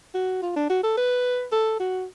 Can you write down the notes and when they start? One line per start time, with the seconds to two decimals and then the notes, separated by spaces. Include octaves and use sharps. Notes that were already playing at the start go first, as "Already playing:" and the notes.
0.14 F#4
0.42 F4
0.56 D4
0.70 F#4
0.83 A4
0.97 B4
1.52 A4
1.80 F#4